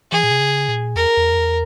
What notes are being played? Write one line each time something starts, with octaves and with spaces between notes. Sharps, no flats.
E3 G#4
A#2
C3
C#3
A#2
E2 A#4
E2
F2
E2